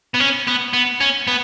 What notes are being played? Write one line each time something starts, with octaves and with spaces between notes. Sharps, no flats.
B3
C#4
B3
B3
C#4
B3